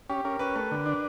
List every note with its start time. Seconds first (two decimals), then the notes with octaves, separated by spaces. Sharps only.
0.09 C#4 G4
0.25 C#4 A#4
0.39 C#4 B4
0.56 A3 B4
0.72 D3
0.86 D4